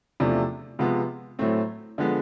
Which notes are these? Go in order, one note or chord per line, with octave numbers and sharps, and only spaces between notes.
E2 C3 F3 A3 D4
C3 F3 G#3 B3
A2 F#3 A3 C4
D3 F3 G#3 B3